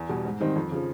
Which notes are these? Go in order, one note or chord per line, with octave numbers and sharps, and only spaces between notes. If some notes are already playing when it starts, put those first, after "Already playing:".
Already playing: E2
B2 G3
G#2
D#3 G3 C4 D#4
F2
C#3 F3